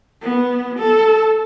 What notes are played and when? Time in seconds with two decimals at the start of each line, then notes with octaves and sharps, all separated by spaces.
0.22 B3
0.79 A4